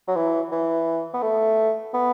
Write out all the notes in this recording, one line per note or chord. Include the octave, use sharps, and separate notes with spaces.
F#3
E3
E3
B3
A3
B3